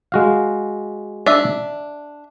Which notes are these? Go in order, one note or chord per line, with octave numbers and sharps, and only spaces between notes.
G#3 F#4 F5
D4 E5